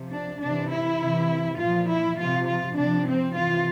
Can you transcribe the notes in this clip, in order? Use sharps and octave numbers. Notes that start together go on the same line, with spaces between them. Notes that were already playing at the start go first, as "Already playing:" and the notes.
Already playing: C3 F3
D4
C3 E3 D4
E4
C3 E3
A#2 F3 F4
E4
C3 F3 F4
F4
C3 F3 D4
C4
C3 E3 F4